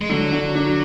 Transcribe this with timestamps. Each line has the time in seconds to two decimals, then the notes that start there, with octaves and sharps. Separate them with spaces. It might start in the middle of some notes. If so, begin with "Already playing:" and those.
0.01 G#3
0.09 D3 F#3
0.32 D3
0.55 D4